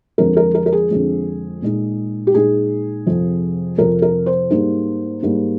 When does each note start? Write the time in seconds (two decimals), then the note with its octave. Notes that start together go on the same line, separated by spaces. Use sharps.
0.18 F2 D3 F3 G#3 A#4
0.37 A#4
0.55 A#4
0.66 A#4
0.73 G#4
0.91 F2 D3 F3 G#3
1.62 A#2 G#3 D#4
2.27 G4
2.34 A#2 G#3 D#4 G#4
3.06 F2 C3 F3
3.78 F2 C3 F3 A#4
4.02 A#4
4.26 C5
4.50 G#2 G3 A#3 D#4
5.22 G#2 G3 A#3 D#4